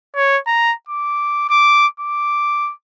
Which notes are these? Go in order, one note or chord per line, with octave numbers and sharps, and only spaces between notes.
C#5
A#5
D6
D6
D6